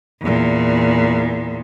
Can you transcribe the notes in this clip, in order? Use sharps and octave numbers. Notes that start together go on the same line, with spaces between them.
E2 A#2